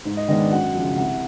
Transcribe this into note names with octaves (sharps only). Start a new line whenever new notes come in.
G#2
D#5
D#3 G#3 B3 D4 D#5
D5
F#2 F#5
C#3 F3
C2 F#5